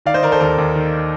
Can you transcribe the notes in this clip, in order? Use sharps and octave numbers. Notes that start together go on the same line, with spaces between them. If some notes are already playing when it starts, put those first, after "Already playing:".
D#3 D5 F5
C5 D#5
D#3 A#4 D5
A4 C5
D#2 A#4
D#2
D#3